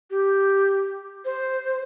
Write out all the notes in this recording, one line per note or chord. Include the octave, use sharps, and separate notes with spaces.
G4
C5